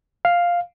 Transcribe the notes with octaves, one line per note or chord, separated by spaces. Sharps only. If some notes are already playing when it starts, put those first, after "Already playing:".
F5